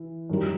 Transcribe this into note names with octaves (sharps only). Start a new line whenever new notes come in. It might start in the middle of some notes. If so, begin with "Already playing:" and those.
Already playing: E3
F#2 D#3 G3